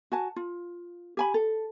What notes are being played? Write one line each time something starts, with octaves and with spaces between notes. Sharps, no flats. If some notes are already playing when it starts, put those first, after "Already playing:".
F#4 G#5 A5
F4
G4 G#5 B5
A4